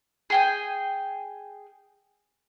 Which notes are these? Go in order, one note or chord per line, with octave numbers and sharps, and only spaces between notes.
G#4 G5 G#5